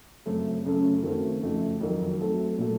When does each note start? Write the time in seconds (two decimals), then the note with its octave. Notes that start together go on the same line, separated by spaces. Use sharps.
0.26 F#2 C#3 A3 C4
0.65 F#2 C#3 A3 C#4 A4
1.03 D#3 A3 C4 F#4
1.43 F2 C#3 A3
1.81 F2 D#3 F#3
2.20 F#3 A3 C4 F#4 A4
2.58 A#2 F#3 A3